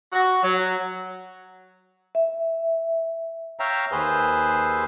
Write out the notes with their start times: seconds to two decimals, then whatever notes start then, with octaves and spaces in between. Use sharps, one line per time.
0.13 F#4
0.43 F#3
2.15 E5
3.60 C#5 E5 F5 G5 A#5
3.92 D#2 G#4 B4 C5 C6 E6